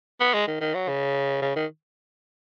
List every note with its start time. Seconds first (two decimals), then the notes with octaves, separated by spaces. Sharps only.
0.20 B3
0.34 G#3
0.48 D#3
0.61 D#3
0.74 F#3
0.88 C#3
1.42 C#3
1.55 D#3